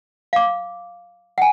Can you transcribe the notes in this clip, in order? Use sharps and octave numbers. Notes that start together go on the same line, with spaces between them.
F5 D6
F#5 G#5